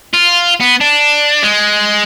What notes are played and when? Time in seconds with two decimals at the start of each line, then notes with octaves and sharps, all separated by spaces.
0.14 F4
0.60 B3
0.81 D4
1.44 G#3